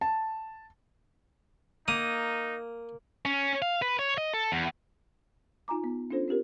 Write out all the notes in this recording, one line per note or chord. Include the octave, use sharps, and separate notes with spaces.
A5
A#3 D#4 D#6
C#4
F5
B4
C#5
D#5
A4
E2
D#4 F4 G#5 A#5 D6
B3
C#4 D4 F4 A4 C5
C4 F4 G4 A#4